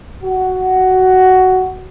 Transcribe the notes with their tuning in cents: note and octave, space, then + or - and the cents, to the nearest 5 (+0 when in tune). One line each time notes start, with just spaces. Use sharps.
F#4 +10